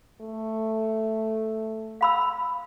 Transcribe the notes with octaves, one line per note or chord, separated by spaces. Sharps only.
A3
F5 B5 E6